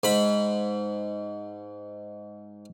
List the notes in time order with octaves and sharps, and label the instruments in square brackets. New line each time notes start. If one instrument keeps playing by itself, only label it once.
[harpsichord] G#2 B5